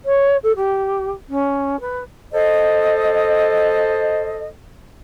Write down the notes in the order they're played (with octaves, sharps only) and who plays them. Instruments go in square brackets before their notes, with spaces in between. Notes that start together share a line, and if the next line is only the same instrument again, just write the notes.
[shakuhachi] C#5
A4
G4
C#4
B4
[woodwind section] A4 C5 D#5